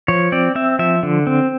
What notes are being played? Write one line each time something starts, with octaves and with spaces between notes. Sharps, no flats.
F3 C#5
C4 D5
C4 E5
F3 E5
D3
C4